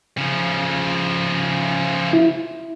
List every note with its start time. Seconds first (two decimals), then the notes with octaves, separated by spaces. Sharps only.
0.18 C#3 F3
2.13 E4